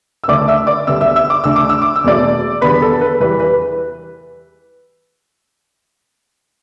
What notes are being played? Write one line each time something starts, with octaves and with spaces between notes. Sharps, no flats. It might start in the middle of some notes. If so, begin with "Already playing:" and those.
E6
D2 D3 A3 D5 D6
E5 E6
D5 D6
D2 D3 G3 B3 E5 E6
E5 E6
E5 E6
D6
D2 D3 A3 E6
D6
E6
D6
E6
E2 B2 A3 D5 D6
E2 D3 G3 B3 B4 B5
A4
B4
E2 E3 G3 B4
B4